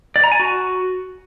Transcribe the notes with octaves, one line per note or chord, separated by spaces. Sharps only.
D5
A#5
G#5
F#4